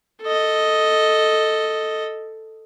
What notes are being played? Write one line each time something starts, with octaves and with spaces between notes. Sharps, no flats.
A4 D#5